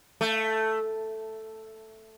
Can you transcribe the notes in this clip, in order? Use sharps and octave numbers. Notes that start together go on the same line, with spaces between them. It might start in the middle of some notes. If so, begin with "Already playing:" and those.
A3